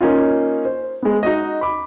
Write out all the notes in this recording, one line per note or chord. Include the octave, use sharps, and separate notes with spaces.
A#3 C#4 D#4 F4
C5
G#3 B3
D#4 F#4 D#5
B5 D6